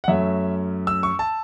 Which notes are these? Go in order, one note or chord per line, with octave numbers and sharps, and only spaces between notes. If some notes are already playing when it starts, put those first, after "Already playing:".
F#5
F#2 F#3 A3 C#4 E5
E6
C#6
A5